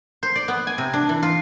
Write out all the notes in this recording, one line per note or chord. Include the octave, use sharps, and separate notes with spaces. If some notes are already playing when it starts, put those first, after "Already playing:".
C5
D5
B3
G#5
C3
D4
E3
F4